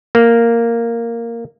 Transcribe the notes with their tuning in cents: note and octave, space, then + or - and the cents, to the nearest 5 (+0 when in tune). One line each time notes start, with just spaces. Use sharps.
A#3 -5